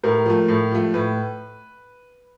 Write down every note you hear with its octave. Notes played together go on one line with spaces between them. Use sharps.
A2 A#4
F3 A3
A2
F3 A3
A2 B4